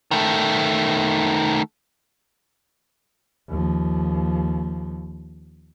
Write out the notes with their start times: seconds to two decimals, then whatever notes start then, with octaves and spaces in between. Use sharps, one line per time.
0.11 D#3 A3
3.49 D#2 F3